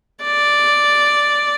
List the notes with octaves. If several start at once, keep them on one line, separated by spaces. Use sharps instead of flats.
D5